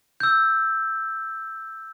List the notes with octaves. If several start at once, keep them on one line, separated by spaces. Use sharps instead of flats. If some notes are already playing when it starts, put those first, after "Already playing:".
E6 G6